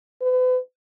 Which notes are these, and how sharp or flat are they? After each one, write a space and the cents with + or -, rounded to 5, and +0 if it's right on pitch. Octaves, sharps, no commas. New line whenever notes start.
B4 +40